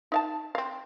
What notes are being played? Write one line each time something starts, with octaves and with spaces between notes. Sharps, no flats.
D#4 F5 A5
C4 F5